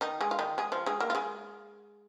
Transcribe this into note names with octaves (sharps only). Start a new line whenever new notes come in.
D#3 D#4
G#3 G#4
F4
D#3 D#4
G#3 G#4
F3 F4
G#3 G#4
A#3 A#4
F4
G#3 G#4